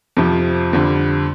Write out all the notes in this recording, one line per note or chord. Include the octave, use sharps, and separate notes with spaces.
F2 C3 F3
F2 D3 G3